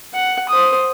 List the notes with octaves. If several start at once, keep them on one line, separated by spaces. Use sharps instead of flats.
F#5
C5 D#6